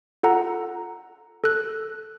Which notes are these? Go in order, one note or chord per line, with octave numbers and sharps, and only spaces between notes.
F4 A4 F#5 A#5
A4 F#6